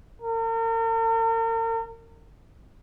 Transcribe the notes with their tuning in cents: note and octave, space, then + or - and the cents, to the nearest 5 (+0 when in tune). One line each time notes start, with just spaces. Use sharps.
A#4 -40